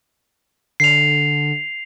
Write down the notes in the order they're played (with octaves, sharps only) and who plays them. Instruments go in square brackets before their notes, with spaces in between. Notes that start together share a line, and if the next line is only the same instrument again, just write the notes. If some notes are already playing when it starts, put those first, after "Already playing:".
[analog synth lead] D3 [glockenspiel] C7 F7